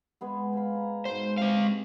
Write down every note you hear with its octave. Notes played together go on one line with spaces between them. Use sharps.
G#3 B3 G#4
C5 F5 B5
A#5
G#2 B2 C5
C3 G#3 C4 F5